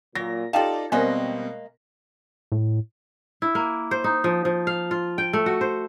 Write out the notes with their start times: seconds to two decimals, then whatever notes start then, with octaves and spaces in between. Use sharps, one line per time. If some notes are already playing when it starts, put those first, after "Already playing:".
0.15 A#2 F#3 A#6
0.53 D#4 F4 G4 A4 D5 F5 G5 A5
0.92 B2 G3 G#3 A#3 C4 A#4 D#5 G#5
2.52 A2
3.42 E4
3.55 A#3
3.91 C5
4.04 D#4
4.24 F3
4.45 F3
4.67 F5
4.91 F4
5.18 G5
5.33 A3
5.46 F#4
5.61 C5